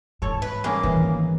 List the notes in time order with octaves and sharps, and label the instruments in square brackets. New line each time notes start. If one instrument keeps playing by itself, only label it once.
[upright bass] G#2 [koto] A4 C#5
[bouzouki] B4
[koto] G3 C#4 G#4 [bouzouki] A#3
[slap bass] G#1 [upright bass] A#2 [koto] E3